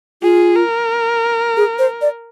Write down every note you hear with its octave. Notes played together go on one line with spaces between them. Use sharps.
F4 G#4
A#4
G#4
C5
D5